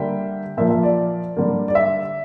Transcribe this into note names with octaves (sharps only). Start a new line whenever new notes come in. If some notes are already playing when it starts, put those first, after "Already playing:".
Already playing: D3 G3 A#3 E5 G5
A#2 F3 A#3 E5
E5
D5
D3 G3 A#3
D5
E5